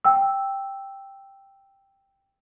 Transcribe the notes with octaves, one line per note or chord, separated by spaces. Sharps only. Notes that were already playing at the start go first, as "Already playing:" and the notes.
G5 E6